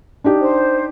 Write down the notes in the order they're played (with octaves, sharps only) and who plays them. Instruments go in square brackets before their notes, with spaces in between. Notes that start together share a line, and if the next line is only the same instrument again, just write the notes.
[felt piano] D4 D#4 G4
[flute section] C5